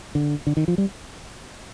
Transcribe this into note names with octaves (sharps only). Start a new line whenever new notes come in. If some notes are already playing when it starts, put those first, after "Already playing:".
D3
D3
D#3
F3
G3